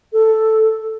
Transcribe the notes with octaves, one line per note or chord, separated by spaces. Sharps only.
A4